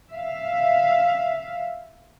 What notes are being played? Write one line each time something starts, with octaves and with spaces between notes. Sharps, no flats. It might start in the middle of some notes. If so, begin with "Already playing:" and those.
E5 F5